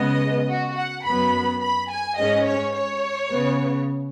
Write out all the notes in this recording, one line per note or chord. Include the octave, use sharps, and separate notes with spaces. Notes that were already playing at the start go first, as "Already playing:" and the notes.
Already playing: C#3 G#3 B3 D#5
F#4
F#5
F#2 F#3 B3 B5
B5
G#5
G#2 G#3 C#4 D#5
C#5
C#5
C#3 B3